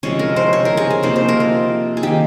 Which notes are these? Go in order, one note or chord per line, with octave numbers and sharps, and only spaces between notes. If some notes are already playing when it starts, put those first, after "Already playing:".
C3 F3 G#3 C#4 C#5
A#4
C5
C#5
A#4
G#4
G#4
C3 F3 A#3 D#4 C5
C5
A#4
F4
G#4
D#3 A#3 D#4 G4